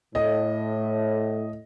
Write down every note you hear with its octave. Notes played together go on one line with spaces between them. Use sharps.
A2 D#5